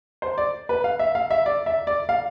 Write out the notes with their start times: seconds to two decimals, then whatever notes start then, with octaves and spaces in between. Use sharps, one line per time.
0.22 C5
0.38 D5
0.69 B4
0.84 F5
0.99 E5
1.15 F5
1.30 E5
1.46 D5
1.66 E5
1.87 D5
2.09 F5